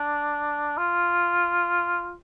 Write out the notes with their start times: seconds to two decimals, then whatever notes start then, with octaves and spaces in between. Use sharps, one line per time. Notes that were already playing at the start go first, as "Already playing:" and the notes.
Already playing: D4
0.78 F4